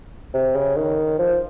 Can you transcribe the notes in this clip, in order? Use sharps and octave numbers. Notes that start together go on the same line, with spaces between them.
C3
C#3
D#3
F3